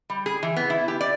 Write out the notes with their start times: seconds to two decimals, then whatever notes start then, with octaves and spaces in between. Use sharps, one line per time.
0.10 G3
0.26 G#4
0.43 E3
0.56 B3
0.70 E4
0.88 G4
1.01 D5